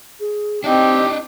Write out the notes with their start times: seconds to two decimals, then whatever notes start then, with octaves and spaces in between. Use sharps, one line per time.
0.20 G#4
0.64 C4 D4 D#4 G4 D#5